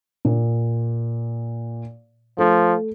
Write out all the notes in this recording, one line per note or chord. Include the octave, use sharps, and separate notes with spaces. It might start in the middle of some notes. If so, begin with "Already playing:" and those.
A#2
F3 A3